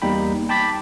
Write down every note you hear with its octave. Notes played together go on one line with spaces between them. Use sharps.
E2 G3 A#3 D#4 G5 B5
G5 A5 B5 D6 A6 B6